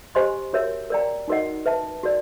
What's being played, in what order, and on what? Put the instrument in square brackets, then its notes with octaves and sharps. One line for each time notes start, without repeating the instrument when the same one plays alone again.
[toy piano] G4 C5 D#5 G#5 C6
F#4 A#4 C#5 E5
A#4 D5 G5 A#5
D#4 F#4 A#4 D#5 F#5
B4 E5 A5
F#4 A#4 D5